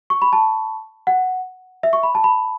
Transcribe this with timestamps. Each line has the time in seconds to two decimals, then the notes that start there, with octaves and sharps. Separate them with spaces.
0.10 C#6
0.22 B5
0.33 A5
1.07 F#5
1.83 E5
1.93 C#6
2.03 B5
2.15 A5
2.24 B5